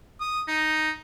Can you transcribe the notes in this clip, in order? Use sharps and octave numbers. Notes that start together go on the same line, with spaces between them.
D#6
D#4